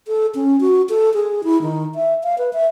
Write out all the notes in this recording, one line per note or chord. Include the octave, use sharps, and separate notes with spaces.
A4
C#4
F#4
A4
G#4
E4
D#3
E5
F5
B4
E5